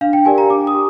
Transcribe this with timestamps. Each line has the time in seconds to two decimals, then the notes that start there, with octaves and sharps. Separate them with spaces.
0.01 D4 F5
0.13 G5
0.25 G4 A#4 D5 G#5
0.38 A#5
0.50 D4 D6
0.67 D#6
0.74 G4